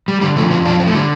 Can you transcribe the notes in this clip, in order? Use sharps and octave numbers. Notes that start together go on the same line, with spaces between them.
G3
D3 G3
F3 A3
F2 B3
F3 D4
F3 C4
A3
D3 G3